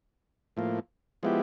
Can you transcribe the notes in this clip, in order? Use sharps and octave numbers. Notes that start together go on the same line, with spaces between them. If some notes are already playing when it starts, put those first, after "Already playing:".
A2 F3 A#3
F3 G#3 B3 E4 G4